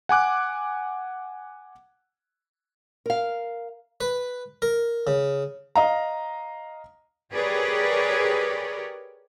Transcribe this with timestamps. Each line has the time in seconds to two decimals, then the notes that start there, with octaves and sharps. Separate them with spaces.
0.09 F#5 G#5 D6 F#6
3.06 A#4 F5
4.01 B4
4.62 A#4
5.07 C#3
5.75 D#5 F5 A#5
7.32 G4 G#4 A#4 B4 C#5 D5